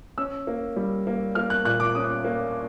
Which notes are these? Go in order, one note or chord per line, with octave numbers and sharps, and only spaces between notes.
C#4 E6
A#3
G3
A#3
A#3 F6
F#6
A#2 F#6
D6
C#4 D#6
A#3